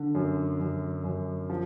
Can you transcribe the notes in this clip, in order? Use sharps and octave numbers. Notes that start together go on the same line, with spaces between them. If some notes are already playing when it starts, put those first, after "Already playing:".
Already playing: D3
F#2
F#2
F#2
F3